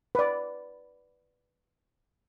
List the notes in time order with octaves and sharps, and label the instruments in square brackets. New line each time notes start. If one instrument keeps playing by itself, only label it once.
[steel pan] B4 D5